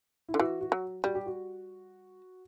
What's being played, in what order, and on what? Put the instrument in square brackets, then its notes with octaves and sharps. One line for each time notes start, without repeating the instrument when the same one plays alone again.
[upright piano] E4
[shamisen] D3
[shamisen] E3 [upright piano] F#4
[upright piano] F#4
[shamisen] F#3
[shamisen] G3 [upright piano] F#4
[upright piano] G4
F#4